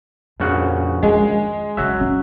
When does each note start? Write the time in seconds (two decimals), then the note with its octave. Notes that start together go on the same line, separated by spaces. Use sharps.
0.40 A#1 F2 C#3 D4 F#4
1.03 D#3 G#3 G#4
1.77 C#2 F#3 E4 E5
2.00 C#4 D4